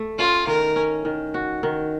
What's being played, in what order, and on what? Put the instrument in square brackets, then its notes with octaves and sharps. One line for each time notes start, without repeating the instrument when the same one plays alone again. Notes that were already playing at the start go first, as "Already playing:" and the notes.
Already playing: [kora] A3
[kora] C#4 [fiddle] F4
[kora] D#3 [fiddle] A#4
[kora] C#4
D#3
F#4
D#3